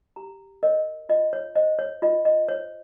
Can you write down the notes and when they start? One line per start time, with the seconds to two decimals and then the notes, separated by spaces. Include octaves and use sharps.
0.16 G4 A#5
0.63 A#4 C#5 D#5
1.09 F4 D#5
1.33 C#5
1.55 C5 D#5
1.79 C#5
2.02 F4 D#5
2.25 D#5
2.48 C5 C#5